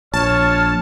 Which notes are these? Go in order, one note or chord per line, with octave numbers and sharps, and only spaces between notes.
A#1 C#5 A5 F6